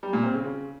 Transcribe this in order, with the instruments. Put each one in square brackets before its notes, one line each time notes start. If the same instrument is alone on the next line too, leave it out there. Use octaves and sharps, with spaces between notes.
[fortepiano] G3
A#2
C4
C#3
C#3